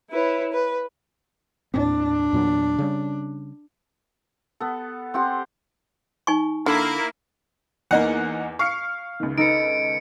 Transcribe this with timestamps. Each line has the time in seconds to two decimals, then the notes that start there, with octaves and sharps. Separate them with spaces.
0.11 E4 B4 C#5
0.53 B4
1.74 D#2 A2 C4 D4
2.33 E2 A#2 F#3
2.78 C#3 G3
4.60 B3 A4
5.14 C4 G4 F#5 C6
6.27 D#4 G#5 C#6
6.66 D3 A#3 E4
7.91 E2 A#3 D#4 F#5
8.59 F5 C#6 C7 C#7
9.20 C#2 D#3
9.38 D#4 A4 B4 C#7 D7